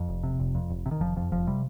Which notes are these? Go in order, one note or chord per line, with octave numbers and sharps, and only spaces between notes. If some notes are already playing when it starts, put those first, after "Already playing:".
Already playing: F2 F3
F1
C3
F1
F2
F1
C3
D#3
F1 F3
F2 F3
F1 F3
C3 G3